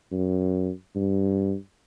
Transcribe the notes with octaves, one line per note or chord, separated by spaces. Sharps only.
F#2
G2